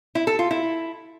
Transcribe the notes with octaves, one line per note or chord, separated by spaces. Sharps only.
E4
A4
F4
E4